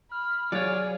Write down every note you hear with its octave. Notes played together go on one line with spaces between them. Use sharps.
B5 F6
F#3 F4 G#4 C#5 D5